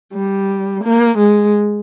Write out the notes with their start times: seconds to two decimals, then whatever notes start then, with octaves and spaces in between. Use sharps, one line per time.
0.14 G3
0.84 A#3
1.18 G#3